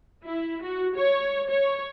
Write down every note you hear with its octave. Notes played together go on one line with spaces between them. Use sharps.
E4
F#4
C#5
C#5